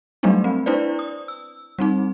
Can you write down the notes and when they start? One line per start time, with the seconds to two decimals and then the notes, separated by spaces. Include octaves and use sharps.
0.23 F#3 G3 A3 B3 D4 D#4
0.44 C4
0.66 D4 E4 B4 C5 D5
0.99 D#6
1.28 E6
1.79 G3 C4 D#4